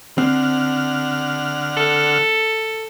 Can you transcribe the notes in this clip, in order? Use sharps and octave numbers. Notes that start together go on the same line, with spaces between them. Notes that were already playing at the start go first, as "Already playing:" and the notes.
D3 C4 F#5 F6
A4